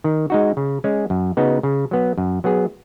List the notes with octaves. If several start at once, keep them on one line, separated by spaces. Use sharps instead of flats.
D#3
G#3 D#4 F#4
C#3
G#3 C#4 G#4
F#2
C#3 B3 D#4 F#4
C#3
F#3 B3
F#2
F#3 B3 G#4